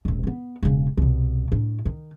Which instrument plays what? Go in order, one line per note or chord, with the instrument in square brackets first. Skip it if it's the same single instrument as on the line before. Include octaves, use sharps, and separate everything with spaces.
[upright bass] E1 A2
B3 C4
E1 C#3
C2 B2
A2 D4
D#3